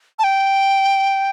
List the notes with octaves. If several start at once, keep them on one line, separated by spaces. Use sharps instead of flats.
A5
G5